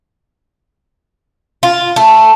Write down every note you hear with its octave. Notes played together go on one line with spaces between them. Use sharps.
F4
A3